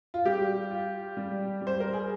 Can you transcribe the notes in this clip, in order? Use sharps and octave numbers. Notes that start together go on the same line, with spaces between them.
F4
G3 G4
F4
G3
G3
C5
A#4
G#4